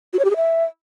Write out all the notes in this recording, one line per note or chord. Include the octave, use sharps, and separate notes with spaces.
F#4
C#5
G4
G#4
E5